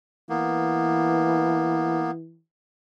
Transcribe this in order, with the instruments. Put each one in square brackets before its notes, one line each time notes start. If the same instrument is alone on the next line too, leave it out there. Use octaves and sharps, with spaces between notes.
[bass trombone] E3 [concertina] A#3 B3